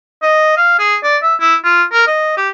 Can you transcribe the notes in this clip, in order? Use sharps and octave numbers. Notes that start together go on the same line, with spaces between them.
D#5
F5
G#4
D5
E5
E4
F4
A#4
D#5
G4